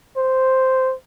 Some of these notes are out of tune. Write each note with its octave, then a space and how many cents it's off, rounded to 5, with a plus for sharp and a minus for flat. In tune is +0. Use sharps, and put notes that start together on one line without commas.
C5 -5